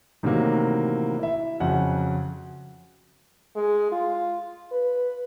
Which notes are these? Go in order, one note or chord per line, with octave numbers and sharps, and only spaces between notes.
A2 C3 D#3 E3 F#3 A#3
E4 E5
F2 C#3 F#3 F#5
G#3
F4
B4